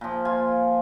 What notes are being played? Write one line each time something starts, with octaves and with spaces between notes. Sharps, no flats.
A#2 F3
F4 G#5